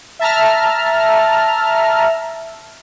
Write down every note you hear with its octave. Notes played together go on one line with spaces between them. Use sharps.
E5 A5 A#5 F6